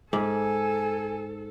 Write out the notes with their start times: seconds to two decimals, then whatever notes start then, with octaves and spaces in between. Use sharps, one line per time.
0.13 G#2 A4 G#5